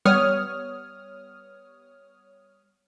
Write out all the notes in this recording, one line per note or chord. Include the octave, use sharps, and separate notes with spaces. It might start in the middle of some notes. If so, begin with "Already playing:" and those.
G3 B3 C#5 D#6 F6